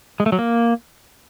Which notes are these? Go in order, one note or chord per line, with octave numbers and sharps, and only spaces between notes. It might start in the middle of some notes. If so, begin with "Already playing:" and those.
G#3
A3
F#3
A#3